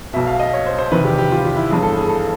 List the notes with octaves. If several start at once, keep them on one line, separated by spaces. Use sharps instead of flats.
B1 B2 E5
F5
D#5
C#5
C5
C5
F1 E2 C3 D#3 B4
G4
G4
F4
F4
E4
G1 G2 E3 G#4
A4
G#4
A4